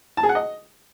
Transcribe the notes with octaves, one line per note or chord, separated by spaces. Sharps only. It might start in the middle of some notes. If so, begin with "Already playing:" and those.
A5
G#4
F#5
D#5